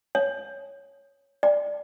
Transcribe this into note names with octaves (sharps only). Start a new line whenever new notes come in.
C#5
D5